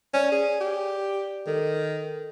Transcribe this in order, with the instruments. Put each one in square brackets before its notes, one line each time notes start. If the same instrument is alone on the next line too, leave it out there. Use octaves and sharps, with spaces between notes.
[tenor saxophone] C#4 [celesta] C5 D5
[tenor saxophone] G#4
G4
[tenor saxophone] D#3 [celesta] A4